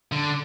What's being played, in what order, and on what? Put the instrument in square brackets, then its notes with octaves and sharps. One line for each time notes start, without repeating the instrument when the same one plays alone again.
[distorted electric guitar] D3